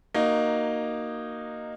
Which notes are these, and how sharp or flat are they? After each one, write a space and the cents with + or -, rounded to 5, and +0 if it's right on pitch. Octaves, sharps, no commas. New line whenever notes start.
A#3 +0 D#4 -15 F#4 +15